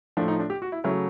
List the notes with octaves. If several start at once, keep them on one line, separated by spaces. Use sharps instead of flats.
A2 F3 A3 D4
D#4
D4
G4
F#4
E4
C#3 F#3 A3 E4